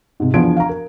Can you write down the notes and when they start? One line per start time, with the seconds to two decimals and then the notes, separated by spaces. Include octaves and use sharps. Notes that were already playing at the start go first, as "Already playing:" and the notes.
0.20 G#2 C3
0.34 E2 F3 D4 G#6 D7
0.57 F5 A#5
0.69 A#4